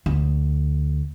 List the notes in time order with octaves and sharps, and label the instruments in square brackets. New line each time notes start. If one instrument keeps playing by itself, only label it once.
[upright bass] D2